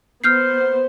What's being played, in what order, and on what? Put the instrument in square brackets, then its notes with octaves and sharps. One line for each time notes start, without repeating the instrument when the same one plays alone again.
[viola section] B3 C5 [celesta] F6 G6 C7